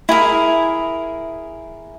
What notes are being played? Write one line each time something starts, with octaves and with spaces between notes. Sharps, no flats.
E4 G#4 A#4 E5